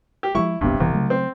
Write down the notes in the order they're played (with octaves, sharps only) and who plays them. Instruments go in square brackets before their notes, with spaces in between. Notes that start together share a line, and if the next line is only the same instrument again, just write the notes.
[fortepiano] G4
[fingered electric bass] F3 F#3 G#3 [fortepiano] E4 C#6
[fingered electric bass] D1 G1 B3 [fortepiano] G2 C3
[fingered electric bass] E1 E3 B3 [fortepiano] C2
[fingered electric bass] C#3 F#3 A3
[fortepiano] C4